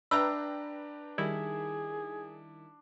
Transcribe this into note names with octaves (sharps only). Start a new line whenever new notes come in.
D4 B4 E5 G5 A#5 E6
D#3 G3 E4 G#4